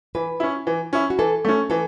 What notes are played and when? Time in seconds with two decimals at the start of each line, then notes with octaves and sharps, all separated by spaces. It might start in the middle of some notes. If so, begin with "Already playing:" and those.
0.15 E3 B4
0.40 C#4 E4
0.67 E3
0.93 C#4 E4
1.10 F#4
1.18 E3 A4
1.45 A3 C#4
1.70 E3 A4